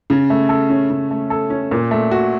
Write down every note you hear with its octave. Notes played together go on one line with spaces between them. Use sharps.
C#3
A3
A4
C#4
C#3
A3
A4
C#4
A#2
A3
F#4